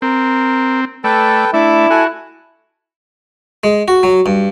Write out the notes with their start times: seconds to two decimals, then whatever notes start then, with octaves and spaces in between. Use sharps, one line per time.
0.02 C4 A#4
1.04 A3 A4 B4 D5 G5
1.54 A3 D4 E4 D6
1.90 F#4 A4 G#5
3.64 G#3
3.88 F#4
4.03 F#3
4.26 G2